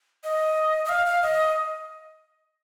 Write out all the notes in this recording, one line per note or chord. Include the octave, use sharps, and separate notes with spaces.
D#5
D#5
F5
F5
D#5